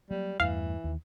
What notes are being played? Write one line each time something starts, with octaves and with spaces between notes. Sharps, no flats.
F#3 G3 A#3
E2 G2 E3 A3 F5
D#2